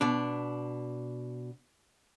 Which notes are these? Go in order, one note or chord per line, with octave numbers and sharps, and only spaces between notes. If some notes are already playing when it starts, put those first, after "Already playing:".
B2 D4